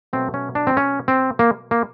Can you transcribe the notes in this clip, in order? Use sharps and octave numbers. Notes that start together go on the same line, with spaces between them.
B2 F#3 A3 C4
C#4
D4
C4
C#4
C4
A#3
A#3